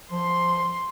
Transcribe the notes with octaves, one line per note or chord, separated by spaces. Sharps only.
F3 C6